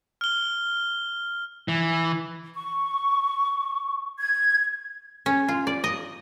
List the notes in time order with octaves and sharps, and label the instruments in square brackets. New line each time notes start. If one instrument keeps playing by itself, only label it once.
[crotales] F6 G7
[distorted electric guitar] E3
[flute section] C#6
G#6
[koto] C#4
F4
D5
D#5